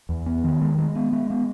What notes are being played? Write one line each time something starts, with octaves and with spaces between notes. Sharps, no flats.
E2
B3
D#3
G#3
G#3
B3
G#3
B3